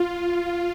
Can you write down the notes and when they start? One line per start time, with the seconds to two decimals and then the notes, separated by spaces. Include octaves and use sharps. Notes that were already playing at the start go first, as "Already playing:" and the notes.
Already playing: F4